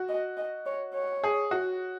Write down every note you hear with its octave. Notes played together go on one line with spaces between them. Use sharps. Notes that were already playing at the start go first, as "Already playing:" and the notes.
Already playing: F#4
D#5
D#5
C#5
C#5
G#4
F#4